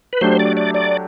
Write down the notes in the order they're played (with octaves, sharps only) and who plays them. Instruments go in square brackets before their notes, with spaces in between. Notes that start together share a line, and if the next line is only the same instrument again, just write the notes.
[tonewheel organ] B4
[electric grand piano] F#3 A3 D4 G4 [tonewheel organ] C5
[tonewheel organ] D5
D5
D5